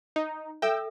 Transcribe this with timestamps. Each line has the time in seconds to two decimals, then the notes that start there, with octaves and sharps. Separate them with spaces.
0.16 D#4
0.62 A4 E5 G5 E6